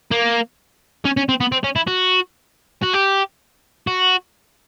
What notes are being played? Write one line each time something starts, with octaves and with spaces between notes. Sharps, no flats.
A#3
C#4
C#4
C4
B3
C4
C#4
E4
F#4
F#4
G4
F#4